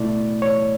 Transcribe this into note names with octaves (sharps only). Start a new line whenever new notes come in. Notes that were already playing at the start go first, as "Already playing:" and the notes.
Already playing: B2 A3 E4 D5
C#5